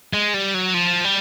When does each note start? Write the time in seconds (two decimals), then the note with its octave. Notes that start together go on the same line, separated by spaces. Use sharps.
0.14 G#3
0.34 G3
0.54 F#3
0.74 F3
1.05 G3